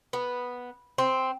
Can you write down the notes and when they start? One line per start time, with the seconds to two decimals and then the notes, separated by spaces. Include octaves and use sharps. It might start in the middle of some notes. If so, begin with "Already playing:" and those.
0.13 B3
0.98 C4